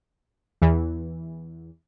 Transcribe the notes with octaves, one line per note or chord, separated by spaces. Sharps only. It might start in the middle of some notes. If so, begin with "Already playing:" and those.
E2 E3